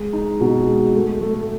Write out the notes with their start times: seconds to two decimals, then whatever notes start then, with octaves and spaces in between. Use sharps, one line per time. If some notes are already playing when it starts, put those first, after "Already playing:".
Already playing: G#3
0.13 D#4
0.41 B2
0.68 G#3
0.95 A3
1.21 A3